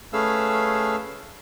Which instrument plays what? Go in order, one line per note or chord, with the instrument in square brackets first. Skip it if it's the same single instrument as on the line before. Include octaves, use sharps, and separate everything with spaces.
[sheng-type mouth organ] A3 C#4 G#4 B4 F5 E6